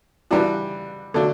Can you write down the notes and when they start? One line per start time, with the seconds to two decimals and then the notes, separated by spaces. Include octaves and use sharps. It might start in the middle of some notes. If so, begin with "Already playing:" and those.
0.31 E3 G3 D4 F#4
1.14 D3 F#3 A3 D4